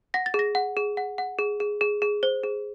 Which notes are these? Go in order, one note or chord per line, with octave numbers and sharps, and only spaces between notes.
F#5 A#6
A6
G#4
A#6
F#5
G#4
F#5
F#5
G#4
G#4
G#4
G#4
C5
G#4